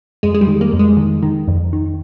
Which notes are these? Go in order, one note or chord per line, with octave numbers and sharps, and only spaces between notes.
F2 G#3
G#3
G3
D#3
A#3
F2
G#3
D#3
D#3
F2
D#3